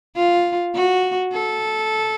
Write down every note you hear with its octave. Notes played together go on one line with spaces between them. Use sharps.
F4
F#4
A4